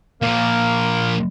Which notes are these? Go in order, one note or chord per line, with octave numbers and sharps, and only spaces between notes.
A#2 F3 A#3